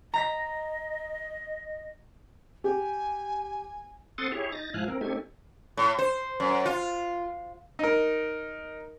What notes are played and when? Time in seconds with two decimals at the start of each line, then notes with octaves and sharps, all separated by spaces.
0.14 D#5 A#5 A#6 B6
2.64 G4 G#5
4.18 C4 A4 F#5 C6 D#6 A6
4.32 E4 G4 G#4 C#5
4.52 D#4 A6 A#6
4.74 G#2 F3 E4 F5 G#5 F#6
4.88 C4 A#4
5.01 A3 C4 D#4 G4 A4 G#6
5.77 A2
5.98 C5
6.40 F#2
6.65 F4
7.79 D#4 A#4